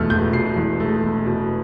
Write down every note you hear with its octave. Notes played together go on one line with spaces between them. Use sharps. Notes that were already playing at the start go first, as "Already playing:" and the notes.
Already playing: E1 E2 B2 A3 F6
E1 G6
B2 C7
E2
A3
E1
B2